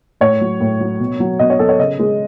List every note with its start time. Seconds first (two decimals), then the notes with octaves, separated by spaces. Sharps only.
0.21 A2 C#5
0.41 F#3
0.60 A2
0.80 F#3
1.00 B2
1.20 F#3
1.39 B2 D#5
1.50 C#5
1.59 F#3 A4
1.69 C#5
1.79 C#3 D#5
1.99 G#3